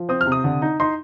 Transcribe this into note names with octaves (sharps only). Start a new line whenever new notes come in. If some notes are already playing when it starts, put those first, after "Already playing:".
Already playing: F3
C4 D#6
F6
C3
D#6
D3
D#4
D#4 C6